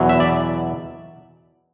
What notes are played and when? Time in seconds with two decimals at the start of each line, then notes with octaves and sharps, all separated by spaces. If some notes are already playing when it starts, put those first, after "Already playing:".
Already playing: E2 B2 F#3
0.09 E5
0.20 D5